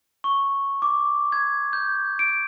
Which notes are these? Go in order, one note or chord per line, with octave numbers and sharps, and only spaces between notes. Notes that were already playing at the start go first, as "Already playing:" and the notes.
C#6
D6
G#6
G6
D7